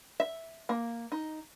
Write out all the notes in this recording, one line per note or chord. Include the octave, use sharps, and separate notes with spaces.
E5
A#3
D#4